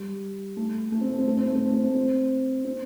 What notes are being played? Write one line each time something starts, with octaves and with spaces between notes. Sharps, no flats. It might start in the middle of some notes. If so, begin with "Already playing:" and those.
Already playing: G3
A3
A3
C4
A3
C4
A3
C4
A3
C4
A3
C4
A3
C4
C4